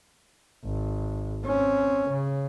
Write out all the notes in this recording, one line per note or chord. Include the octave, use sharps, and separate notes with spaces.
G#1
C4 C#4
C#3